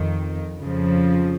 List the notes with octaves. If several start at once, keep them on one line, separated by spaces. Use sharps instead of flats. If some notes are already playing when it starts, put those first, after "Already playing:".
Already playing: F2 D#3
F2 C#3 F3